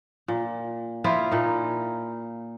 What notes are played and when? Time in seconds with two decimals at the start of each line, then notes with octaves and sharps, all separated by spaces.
0.28 A#2
1.04 F3 E4 F4
1.31 A#2 D#4